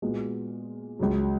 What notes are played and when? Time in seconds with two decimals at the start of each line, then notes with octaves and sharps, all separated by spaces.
0.02 A#2 G#3 B3 F#4
0.99 C#2 C#3 F#3